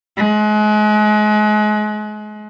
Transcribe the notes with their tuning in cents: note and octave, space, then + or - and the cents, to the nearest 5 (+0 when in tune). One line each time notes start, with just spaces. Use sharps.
G#3 +35